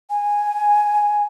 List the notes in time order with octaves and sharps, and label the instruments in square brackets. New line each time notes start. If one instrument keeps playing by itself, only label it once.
[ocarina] G#5